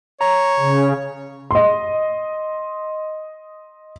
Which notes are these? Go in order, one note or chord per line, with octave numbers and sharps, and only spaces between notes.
C#5 A#5
C#3
D#5 C6